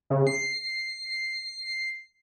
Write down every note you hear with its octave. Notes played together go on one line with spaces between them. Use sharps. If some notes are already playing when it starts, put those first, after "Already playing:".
C#3
C7